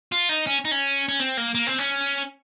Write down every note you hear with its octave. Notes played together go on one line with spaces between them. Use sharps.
F4
D#4
C#4
D#4
C#4
C#4
C4
A#3
A#3
C4
C#4